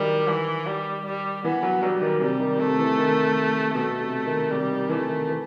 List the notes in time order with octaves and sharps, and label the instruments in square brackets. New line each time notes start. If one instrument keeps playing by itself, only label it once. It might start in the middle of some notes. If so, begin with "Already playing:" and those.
Already playing: [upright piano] D#3 F#3 [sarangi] G3
[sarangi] E3
G3
G3
[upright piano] E3 [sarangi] B3
[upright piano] F#3
[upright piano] F#3 [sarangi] G3
[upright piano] D#3
[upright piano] C3 [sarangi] G3
[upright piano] D#3
[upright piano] C3 [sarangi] A3
[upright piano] E3
D#3
[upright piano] B2 [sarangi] A3
[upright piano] C3
D#3
[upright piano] C3 [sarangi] G3
[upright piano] D#3
[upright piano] E3 [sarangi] A3
[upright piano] D#3
E3